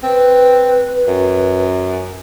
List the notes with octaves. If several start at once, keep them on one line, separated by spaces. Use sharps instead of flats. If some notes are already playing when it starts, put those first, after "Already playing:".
C4 B4
F#2